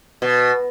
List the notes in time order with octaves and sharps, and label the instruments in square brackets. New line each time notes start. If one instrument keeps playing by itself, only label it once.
[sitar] B2